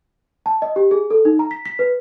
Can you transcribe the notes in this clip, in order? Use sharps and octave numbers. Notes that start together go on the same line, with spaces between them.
A5
D#5
G4
G#4
A4
D#4
A#5
B6
B6
B4